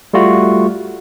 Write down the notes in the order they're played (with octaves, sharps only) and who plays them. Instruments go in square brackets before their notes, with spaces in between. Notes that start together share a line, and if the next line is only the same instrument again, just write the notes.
[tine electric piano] G3 A3 F4 F#4